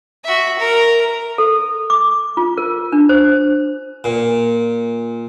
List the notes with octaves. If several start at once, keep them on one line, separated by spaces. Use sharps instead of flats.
F#4 E5
A#4
A4
D6
F4
A#4
D4
C5
A#2